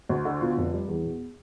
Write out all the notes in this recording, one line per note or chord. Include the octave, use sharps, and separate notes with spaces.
D2
D3
B2 F4
F1
G3
E2
B2